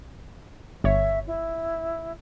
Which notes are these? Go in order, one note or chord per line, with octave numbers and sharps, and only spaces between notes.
G1 C#5 E5
E4